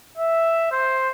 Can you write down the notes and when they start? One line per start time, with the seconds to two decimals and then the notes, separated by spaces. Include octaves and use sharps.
0.17 E5
0.71 C5